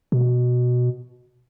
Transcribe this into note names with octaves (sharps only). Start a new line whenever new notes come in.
B2